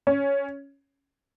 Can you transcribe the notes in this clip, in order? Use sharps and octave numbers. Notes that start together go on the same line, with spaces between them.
C#4